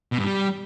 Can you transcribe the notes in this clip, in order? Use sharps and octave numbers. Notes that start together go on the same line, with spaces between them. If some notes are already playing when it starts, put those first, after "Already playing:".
B2
G2
G3